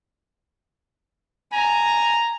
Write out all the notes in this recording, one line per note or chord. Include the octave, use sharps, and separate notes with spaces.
G#5 A#5